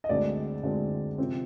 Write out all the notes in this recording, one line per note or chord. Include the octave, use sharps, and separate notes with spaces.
D#5
D2 D3 G#3 C4 D5
D2 D3 G#3 C4
C3 F3 C4